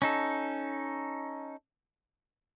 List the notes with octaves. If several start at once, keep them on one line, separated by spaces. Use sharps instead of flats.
C#4 D#4 A4